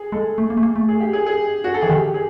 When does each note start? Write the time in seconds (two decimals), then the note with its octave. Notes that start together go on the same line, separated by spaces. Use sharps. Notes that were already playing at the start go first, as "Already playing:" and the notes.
Already playing: G#4
0.12 G#3 A4
0.38 A3
0.50 A#3
0.57 A3
0.63 A#3
0.76 A3
0.88 G#4
1.00 G4
1.13 G#4
1.27 G#4
1.64 F#4
1.74 A4
1.81 E3 G#4
1.89 D#3 G4
2.14 G#4